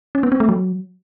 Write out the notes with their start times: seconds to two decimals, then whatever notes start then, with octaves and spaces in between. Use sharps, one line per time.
0.15 C#4
0.23 B3
0.32 C4
0.40 A3
0.49 F#3